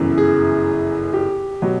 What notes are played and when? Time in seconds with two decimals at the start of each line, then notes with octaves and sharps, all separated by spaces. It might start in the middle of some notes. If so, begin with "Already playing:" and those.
Already playing: G1 F#2 C#3 E3
0.18 G#4
1.14 G4
1.62 B2 F#3